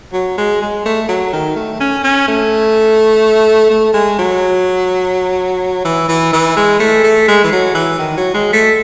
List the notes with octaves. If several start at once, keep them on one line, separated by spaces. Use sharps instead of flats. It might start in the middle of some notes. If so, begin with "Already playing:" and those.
F#3
G#3
G#3
A3
F#3
D#3
A3
C#4
C#4
A3
A3
G#3
F#3
E3
E3
E3
G#3
A3
A3
G#3
E3
F#3
E3
D#3
F#3
G#3
A3